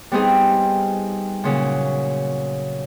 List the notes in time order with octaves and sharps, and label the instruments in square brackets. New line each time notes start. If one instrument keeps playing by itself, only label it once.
[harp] G3 B3 C4 D#4 G#4
A#2 C#3 F#3